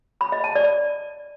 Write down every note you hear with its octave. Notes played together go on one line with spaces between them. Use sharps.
B5
D#5
A5
D5